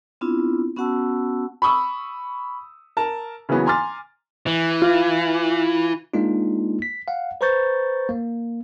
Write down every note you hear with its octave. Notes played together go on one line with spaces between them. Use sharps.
B3 C4 D4 E4 F4
B3 C#4 F#4 F#5 A5 E6
B5 C#6 D#6 E6
A#4 A5
C#3 E3 F#3 A#3 B3
G#5 A#5 C6 D6 F6 A6
E3
F4
G#3 A#3 D4 D#4 F4
B6
F5 F#5
B4 C5 A#5 C#6 G6 A6
A#3